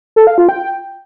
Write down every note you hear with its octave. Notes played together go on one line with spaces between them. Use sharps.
A4
F5
F4
G5